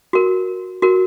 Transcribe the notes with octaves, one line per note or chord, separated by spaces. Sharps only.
F#4 A#4
F#4 A#4